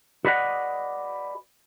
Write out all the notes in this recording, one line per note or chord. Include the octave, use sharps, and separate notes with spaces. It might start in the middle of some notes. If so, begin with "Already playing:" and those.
F#4 G#4 B4 D5 D#5 F#5